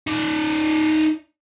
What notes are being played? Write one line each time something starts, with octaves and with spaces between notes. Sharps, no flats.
D#4 D5